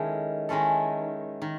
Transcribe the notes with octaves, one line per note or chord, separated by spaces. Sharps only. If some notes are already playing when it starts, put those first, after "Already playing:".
Already playing: D#3 G#3 C#4 E4 A4
D#3 G#3 C#4 E4 A4
D#3